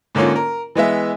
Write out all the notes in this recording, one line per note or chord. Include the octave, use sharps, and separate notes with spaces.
G#2 D3 A#3 C#4 F4
A#4
E3 G#3 B3 E5